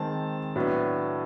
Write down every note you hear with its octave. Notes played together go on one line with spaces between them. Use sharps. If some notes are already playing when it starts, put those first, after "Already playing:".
Already playing: D#3 G#3 C4 A5
A2 F#3 B3 D4